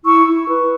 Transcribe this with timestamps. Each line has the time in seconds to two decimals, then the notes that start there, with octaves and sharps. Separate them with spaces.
0.04 E4 C#6 E6
0.26 E4
0.48 B4